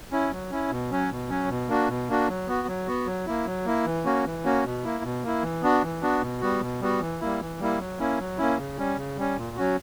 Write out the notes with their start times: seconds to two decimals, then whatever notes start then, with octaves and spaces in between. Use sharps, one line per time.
0.12 C#4 E4
0.31 F#3
0.51 C#4 E4
0.71 B2
0.90 F#3 C#4
1.10 B2
1.30 F#3 C#4
1.49 B2
1.69 A#3 D4 F#4
1.89 B2
2.09 A#3 D4 F#4
2.28 F#3
2.48 B3 F#4
2.68 F#3
2.87 B3 F#4
3.06 F#3
3.27 A#3 E4
3.46 F#3
3.66 A#3 E4
3.86 E3
4.05 A#3 C#4 F#4
4.25 E3
4.45 A#3 C#4 F#4
4.65 B2
4.84 A#3 E4
5.04 B2
5.24 A#3 E4
5.42 E3
5.62 B3 D4 F#4
5.83 E3
6.02 B3 D4 F#4
6.22 B2
6.41 G3 B3 F#4
6.61 B2
6.81 G3 B3 F#4
7.01 E3
7.20 G3 A#3 E4
7.40 E3
7.60 G3 A#3 E4
7.80 F#3
7.99 A#3 C#4 E4
8.19 F#3
8.38 A#3 C#4 E4
8.58 C#3
8.77 G3 C#4
8.98 C#3
9.17 G3 C#4
9.37 A#2
9.57 F#3 C#4 F#4